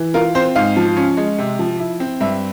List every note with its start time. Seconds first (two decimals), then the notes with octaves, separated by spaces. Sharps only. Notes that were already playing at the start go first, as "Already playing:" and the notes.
Already playing: E3
0.14 F4 A#4
0.35 C4 C5
0.56 G#2 F5
0.77 F3
0.97 C#4
1.17 G#3
1.38 C3
1.59 F3
1.80 E4
2.00 C4
2.21 G2 E5